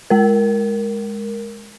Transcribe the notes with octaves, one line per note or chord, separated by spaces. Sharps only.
G#3 A#4